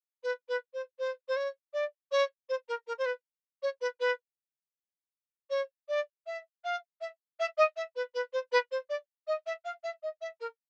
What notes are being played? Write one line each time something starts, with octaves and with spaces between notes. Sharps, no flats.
B4
B4
C5
C5
C5
C#5
D5
C#5
C5
A#4
A#4
C5
B4
C#5
B4
B4
C#5
D5
E5
F5
E5
E5
D#5
E5
B4
B4
C5
B4
C5
D5
D#5
E5
F5
E5
D#5
E5
A#4